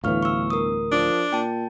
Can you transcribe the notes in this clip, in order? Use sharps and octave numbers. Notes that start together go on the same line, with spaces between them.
G1 D2 A2 E3 F5 C#6 F6
C#6 E6
A#4 D#6
F3 D4
A#2 G5 A5